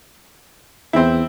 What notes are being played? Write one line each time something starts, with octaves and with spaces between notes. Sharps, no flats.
E2 C4 E4